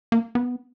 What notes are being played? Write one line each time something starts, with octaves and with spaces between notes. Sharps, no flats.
A#3
B3